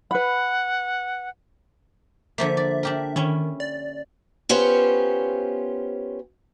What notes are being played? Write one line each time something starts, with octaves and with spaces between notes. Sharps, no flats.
B4 F#5 B5
D3 F3 A#3 E5
D5
D4 G4 A#4
D#3 C#4 E4
D5
B3 C#4 F4 G4 C5